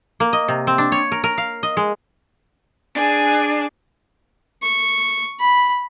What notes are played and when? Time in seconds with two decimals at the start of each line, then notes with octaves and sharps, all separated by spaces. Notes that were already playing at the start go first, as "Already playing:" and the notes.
0.20 A#3
0.33 D#5
0.48 C3
0.67 C4
0.78 D4
0.92 C#5
1.12 A#4
1.24 A#4
1.38 F5
1.63 D#5
1.77 G#3
2.96 D4 G#4 G#5
4.62 C#6
5.40 B5